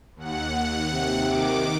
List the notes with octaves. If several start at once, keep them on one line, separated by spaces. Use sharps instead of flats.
D#2 F#5
C3
D#3 D6